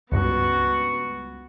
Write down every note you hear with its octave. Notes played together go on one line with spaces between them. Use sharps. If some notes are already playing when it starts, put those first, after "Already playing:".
C#2 G2 B3 F#4